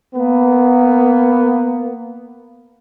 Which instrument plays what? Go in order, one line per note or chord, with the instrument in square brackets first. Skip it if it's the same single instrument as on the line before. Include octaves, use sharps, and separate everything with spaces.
[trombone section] A#3 B3